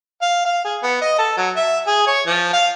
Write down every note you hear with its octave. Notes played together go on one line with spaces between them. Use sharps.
F5
F5
G#4
B3
D#5
A4
F#3
E5
G#4
C#5
F3
F5